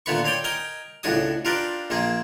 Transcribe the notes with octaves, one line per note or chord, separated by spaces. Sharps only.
A#2 D3 A3 B3 B5 C#6
C4 C#5 D5 G5
A#4 D#5 G5 G#5
C#2 A2 D4 F#4 G#5 D#6
D4 F4 G4 A#4 B4 D5
A#1 A#3 C4 G#4